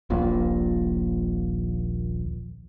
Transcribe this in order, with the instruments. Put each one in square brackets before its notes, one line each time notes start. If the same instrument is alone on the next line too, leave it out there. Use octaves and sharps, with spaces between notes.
[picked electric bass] D#1 A#1 A#2